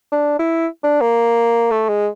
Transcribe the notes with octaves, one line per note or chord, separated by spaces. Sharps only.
D4
E4
D4
A#3
A3
G#3